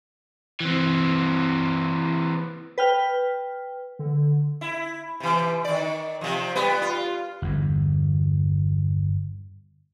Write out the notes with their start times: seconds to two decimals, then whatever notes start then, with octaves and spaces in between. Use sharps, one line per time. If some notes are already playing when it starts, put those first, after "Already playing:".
0.60 E3 C4
2.78 B4 G5 F6
3.99 D3
4.61 E4
5.20 C3 E3
5.64 D#3 D5
6.21 C3 F3
6.55 G3 B3
6.82 F4
7.42 G1 E2